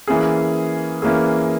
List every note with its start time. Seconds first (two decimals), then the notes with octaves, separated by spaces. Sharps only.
0.07 E3 A#3 C#4 G#4
1.02 E3 A#3 C#4 G#4